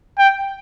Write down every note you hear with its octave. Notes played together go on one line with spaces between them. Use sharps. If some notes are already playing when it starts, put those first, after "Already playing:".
G5